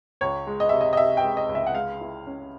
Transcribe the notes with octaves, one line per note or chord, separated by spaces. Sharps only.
C#2 C#5
G#3
D#5
C3 E5
D#5
D#5
C3 E5
G5
G#3
D#5
C#2
E5
F#5
G#3 F5
E4
C#4